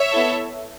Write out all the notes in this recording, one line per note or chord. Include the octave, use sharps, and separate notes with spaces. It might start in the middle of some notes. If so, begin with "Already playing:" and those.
Already playing: C#5 E5
B3 E4 A4